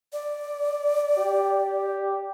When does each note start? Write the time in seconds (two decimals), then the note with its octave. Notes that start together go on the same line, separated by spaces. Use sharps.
0.13 D5
1.18 G4